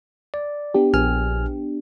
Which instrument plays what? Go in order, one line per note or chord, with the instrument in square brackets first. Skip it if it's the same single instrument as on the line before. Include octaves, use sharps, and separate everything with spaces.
[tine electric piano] D5
[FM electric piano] B3 D4 G4
[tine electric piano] A#1 G#5 F6